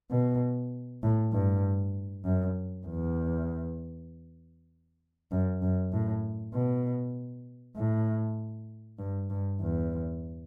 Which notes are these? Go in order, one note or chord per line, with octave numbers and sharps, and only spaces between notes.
B2
A2
G2
F#2
E2
F#2
F#2
A2
B2
A2
G2
G2
E2